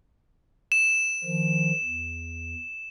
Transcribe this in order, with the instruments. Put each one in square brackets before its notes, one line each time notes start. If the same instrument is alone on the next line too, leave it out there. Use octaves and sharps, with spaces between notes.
[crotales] E7
[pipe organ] D#3 F3
E2